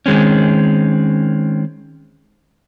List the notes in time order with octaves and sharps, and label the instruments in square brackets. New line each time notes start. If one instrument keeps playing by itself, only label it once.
[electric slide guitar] D#3 G#3 C4 C#4